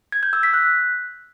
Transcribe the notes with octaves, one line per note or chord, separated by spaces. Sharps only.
G#6
G6
E6
B6
F#6